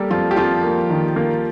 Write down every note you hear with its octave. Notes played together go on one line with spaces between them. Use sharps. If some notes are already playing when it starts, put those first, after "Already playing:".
Already playing: G3 A#3 G4 A4 A#4
F2 F3 F4
G4
F2 F3 F4
A#3
D#3
A#3